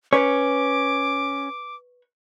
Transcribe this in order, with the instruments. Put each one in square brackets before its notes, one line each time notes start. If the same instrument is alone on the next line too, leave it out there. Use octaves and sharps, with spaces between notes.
[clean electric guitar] C#4 [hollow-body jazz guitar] B4 C#5 [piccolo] D6